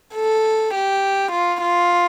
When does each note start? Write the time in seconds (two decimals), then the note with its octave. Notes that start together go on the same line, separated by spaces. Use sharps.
0.15 A4
0.74 G4
1.33 F4
1.61 F4